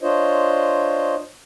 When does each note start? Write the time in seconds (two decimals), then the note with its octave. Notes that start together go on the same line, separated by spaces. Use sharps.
0.02 D4 F4 C5 C#5 D#5